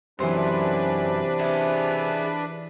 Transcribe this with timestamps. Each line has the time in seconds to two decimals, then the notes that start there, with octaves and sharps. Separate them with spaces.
0.20 F#2 C3 E3 D4 B4 C5
1.40 G#4 E5